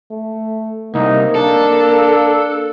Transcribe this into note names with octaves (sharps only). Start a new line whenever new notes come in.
A3
C2 A#3 D#4
D4 A4